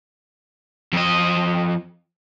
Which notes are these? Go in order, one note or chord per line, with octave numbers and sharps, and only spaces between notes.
F2 D#5